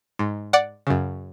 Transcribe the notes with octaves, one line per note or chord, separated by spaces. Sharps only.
G#2
D5 F#5
F#2 C#3